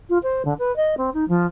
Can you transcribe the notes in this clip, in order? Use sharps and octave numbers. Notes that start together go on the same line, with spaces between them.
F4
C5
D3
B4
D#5
C4
D#4
F3